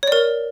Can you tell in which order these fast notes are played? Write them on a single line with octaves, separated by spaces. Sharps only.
C#5 D5 A#4